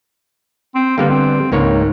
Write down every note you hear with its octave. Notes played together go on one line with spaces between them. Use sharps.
C4
D3 G3 A#3 B3
C4
C#2 G#2 A#3 C#5